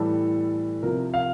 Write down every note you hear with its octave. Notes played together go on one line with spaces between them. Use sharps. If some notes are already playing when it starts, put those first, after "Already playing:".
Already playing: A2 E3 G3 A4
C3 F3 A#4
F5